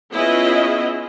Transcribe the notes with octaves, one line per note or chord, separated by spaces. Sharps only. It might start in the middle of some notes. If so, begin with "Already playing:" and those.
B3 C#4 E4 F4 G#4 D#5